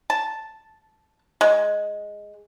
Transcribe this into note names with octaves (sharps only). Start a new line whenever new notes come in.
A5
G#3